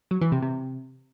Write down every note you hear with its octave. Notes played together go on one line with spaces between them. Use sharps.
F#3
E3
C3
C3